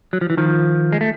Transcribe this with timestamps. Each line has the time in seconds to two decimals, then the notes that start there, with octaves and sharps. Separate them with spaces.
0.13 F#3
0.21 F3
0.30 E3
0.37 D#3 F3
0.93 G#3
1.01 A3